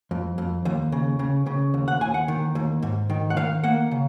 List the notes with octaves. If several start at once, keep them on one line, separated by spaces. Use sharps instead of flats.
F2
F2
D#2
C#3
C#3
C#3
D#2
F#5
D#2 G#5
F#5
D#3
D#2
G#2
D#3
F#5
D#3 F5
A#3 F#5
C#3